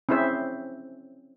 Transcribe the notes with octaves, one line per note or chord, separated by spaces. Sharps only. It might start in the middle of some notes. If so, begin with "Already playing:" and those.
C4 C#4 E4 G#4 C5 E5